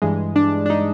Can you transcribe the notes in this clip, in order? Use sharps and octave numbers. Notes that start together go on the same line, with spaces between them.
G2 E3 G#3
D4
D4
D#4